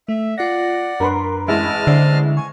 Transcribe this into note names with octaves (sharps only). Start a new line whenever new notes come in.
A3 E5
F4 D5 F#5 A#6
F#2 D4 A#4 B4 B5 C6
A1 G#3 E4 D#5 A5 F6
D3 C5 D5 C7
G#5 C#6